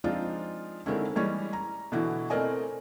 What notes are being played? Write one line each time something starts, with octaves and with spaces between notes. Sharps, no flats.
F3 G#3 C4 D4 D#4 F4
D3 D#3 G#3 C4 C#4 E4
E3 G3 G#3 C#4
A#5
B2 D3 E3 E4 F#4
A3 C4 A#4 D5 D#5 G#5